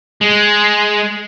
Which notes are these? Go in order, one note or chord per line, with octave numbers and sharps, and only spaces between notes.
G#3